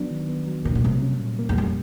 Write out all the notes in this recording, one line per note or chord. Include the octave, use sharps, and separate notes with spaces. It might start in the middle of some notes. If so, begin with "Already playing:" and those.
Already playing: F#3 B3 D4
D#3
B3
F#3
C3 A#3
B2
C3 G3
C#4
A#2
A#3
E2
F2 G3